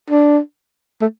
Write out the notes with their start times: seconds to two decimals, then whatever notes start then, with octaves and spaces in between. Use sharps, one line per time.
0.10 D4
1.01 A3